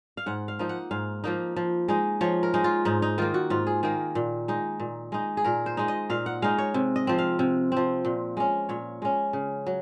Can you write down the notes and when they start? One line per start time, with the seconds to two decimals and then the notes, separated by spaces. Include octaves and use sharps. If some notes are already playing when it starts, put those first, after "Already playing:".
0.17 F5
0.26 G#2 F#5
0.48 F5
0.59 F3 A#3 D#4
0.69 F#5
0.91 G#2 F5
1.24 F3 A#3 D#4
1.56 F3
1.88 G#3 D#4
2.21 F3 C#5
2.43 A#4
2.54 G#3 D#4
2.64 F4
2.85 G#2 D#4
3.02 D#4
3.18 D#3 A#3 F4
3.34 F#4
3.50 G#2 F4
3.67 G#4
3.83 D#3 A#3 G#4
4.15 A#2
4.48 G#3 D#4
4.80 A#2
5.12 G#3 D#4
5.37 G#4
5.44 A#2 A#4
5.66 C5
5.77 G#3 D#4
5.88 D#5
6.10 A#2 F5
6.26 F#5
6.42 G#3 D#4 F5
6.58 C#5
6.74 C3
6.96 D#5
7.07 F3 C4
7.18 F5
7.39 C3
7.72 F3 C4
8.05 A#2
8.37 G#3 C#4
8.69 A#2 C#5
9.02 G#3 C#4
9.33 C#3
9.66 F#3